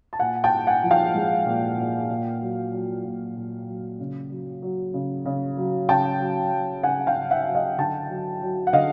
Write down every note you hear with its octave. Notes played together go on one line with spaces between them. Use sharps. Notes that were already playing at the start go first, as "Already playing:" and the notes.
A5
A#2 F#5 G#5
G5 A5
A#2
F#5 G#5
F3
F5 G5
G#3
A#2
A#2
A#2
F#3
F#3
A#2
A#2
F#3
C#3
F#3
F#3
C#3
C#3
F#3
C#3 G5 A5
F#3
F#3
C#3 F#5 G#5
F5 G5
C#3
E5 F#5
F#3
D#5 F5
D3 G5 A5
F#3
F#3
F#5
D3 D#5 F5